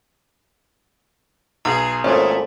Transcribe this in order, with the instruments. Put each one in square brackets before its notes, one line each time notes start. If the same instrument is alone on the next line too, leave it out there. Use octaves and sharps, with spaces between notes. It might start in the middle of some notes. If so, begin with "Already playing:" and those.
[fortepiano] B1 [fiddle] G#4 [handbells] A#5
[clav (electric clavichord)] G#1 A#2 G#4 [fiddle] A3 E4 [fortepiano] C#4 [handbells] C5